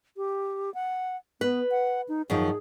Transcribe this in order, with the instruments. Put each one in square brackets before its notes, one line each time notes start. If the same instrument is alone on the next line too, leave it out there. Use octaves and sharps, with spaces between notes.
[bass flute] G4
F#5
[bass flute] B3 [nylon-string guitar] B4
[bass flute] F#5
D#4
[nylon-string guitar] F#2 D#3 F3 [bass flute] G#4